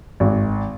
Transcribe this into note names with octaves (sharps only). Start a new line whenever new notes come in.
G#1